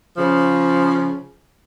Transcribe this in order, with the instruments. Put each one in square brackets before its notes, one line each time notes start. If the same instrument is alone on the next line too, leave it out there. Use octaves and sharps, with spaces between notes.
[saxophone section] C#3 F3